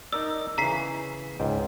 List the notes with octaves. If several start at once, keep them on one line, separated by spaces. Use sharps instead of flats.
D#4 A#4 D5 E6
C#3 E3 A#5 B6 C7
C#2 G#2 G5